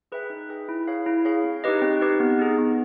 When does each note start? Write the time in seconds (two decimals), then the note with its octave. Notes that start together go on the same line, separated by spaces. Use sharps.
0.12 G#4 B4 E5 G5
0.30 D#4
0.50 G#4 B4 E5 G5
0.69 E4
0.88 G#4 C#5 F5
1.06 E4
1.25 G#4 C#5 F5
1.44 C4
1.64 D#4 G4 B4 D#5
1.82 C4
2.01 D#4 G4 B4 D#5
2.20 B3
2.39 D#4 G#4
2.58 B3